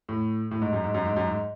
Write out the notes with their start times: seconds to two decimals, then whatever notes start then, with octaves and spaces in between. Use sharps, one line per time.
0.09 A2
0.51 A2
0.62 G#2
0.73 F#2
0.84 G#2
0.94 F#2
1.05 G#2
1.16 F#2
1.27 G#2